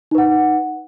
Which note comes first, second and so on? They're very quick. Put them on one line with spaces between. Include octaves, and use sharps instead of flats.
D#4 B4 F#5